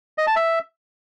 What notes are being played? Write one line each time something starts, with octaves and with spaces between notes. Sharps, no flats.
D#5
A5
E5